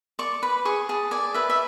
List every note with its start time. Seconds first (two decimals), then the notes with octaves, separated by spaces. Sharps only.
0.19 D5 C#6
0.43 B4 B5
0.65 G#4 C#6
0.89 G#4 A5
1.11 D5 G#5
1.34 B4 E5
1.50 E5